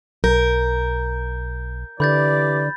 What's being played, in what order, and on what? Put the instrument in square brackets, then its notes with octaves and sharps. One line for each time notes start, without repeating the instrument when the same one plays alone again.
[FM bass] B1 [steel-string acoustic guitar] A#4 [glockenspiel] G6
[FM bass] D3 [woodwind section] E3 G4 D5 [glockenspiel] B5 G6 A6